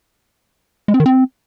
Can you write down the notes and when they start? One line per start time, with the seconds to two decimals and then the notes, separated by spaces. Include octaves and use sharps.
0.88 G#3
0.94 C4
1.00 D#3
1.06 C4